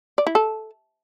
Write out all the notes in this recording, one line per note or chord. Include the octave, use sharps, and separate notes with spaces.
D5
E4
A4